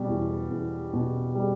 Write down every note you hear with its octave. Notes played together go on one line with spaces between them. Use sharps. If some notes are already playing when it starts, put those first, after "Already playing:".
Already playing: B2 G3
E2
E2
B2
G3